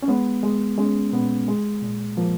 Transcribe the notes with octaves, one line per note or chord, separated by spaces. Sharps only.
C#4
G#3 B3
G#3
G#3 C#4
A#2 B3
G#3
A#2
F3 A#3